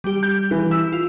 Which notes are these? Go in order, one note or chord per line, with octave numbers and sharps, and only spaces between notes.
G3 G4
G6
E3
E4 E6
F4